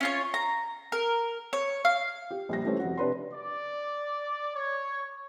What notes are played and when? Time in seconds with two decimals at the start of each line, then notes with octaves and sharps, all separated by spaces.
0.01 C#4 F4 C#5
0.34 A#5
0.92 A#4
1.53 C#5
1.85 F5
2.31 G4
2.49 A#1 G3 A#6
2.64 E3 G3 A3 C#4 G4 C5
2.80 F2 F#4
2.97 C3 D4 B4 C6
3.33 D5
4.55 C#5